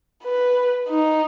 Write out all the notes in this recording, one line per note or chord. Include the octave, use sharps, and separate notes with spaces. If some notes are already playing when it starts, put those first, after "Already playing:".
B4
D#4